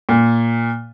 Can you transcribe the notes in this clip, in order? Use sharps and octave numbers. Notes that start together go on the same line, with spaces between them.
A#2